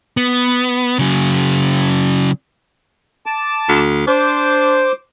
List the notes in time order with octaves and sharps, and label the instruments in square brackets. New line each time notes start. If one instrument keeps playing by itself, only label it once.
[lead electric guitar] B3
C#3 F#3
[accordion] A5 D6
[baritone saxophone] D2
[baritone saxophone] D4 [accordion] C5 D6